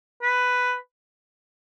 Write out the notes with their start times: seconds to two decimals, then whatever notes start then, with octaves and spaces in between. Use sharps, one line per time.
0.22 B4